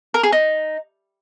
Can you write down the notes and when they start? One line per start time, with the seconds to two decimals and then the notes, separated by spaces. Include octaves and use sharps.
0.14 A#4
0.23 G#4
0.32 D#4